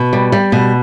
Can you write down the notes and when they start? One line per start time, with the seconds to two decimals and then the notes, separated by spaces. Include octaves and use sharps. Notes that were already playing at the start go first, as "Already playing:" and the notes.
Already playing: B2
0.13 G3
0.32 G3
0.52 B2